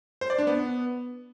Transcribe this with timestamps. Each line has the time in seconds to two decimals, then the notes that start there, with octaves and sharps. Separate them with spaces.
0.21 C5
0.30 D5
0.38 D4
0.47 B3